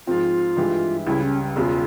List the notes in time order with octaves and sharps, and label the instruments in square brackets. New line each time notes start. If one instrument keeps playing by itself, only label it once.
[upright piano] G#2 F3 C4 [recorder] F4
[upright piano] G2 E3 G#3 E4 G4
[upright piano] C#2 C#3 G3 [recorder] E4
[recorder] C#4
[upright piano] E1 E2 C#3 [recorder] F4 G4